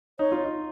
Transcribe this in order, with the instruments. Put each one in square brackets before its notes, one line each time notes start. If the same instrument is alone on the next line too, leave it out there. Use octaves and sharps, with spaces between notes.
[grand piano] D#4 [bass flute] C#5
[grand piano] F4
D#4